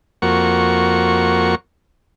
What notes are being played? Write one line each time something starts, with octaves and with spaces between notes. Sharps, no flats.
F2 A#3 F#4 C#6